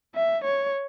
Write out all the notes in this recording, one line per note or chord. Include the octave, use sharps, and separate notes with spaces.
E5
C#5